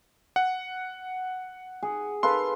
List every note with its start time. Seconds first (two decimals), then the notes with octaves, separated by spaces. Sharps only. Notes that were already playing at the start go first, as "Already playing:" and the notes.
0.36 F#5
1.83 G#4
2.23 A4 B4 F5 C6